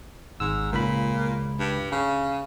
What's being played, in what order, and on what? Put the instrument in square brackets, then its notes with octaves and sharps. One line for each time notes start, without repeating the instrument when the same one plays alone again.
[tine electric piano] G#1 E6 [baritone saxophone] G#2
[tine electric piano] C#2 B5 [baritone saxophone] A#2
[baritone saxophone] G2
C#3